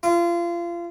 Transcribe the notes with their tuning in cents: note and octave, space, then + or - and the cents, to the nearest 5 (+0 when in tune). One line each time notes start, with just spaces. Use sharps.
F4 -30